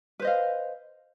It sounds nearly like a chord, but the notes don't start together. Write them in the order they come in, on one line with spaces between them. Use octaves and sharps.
B4 C5 D#5 F5